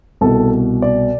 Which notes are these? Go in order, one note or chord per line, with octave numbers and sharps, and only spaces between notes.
C2 B2 A4
D5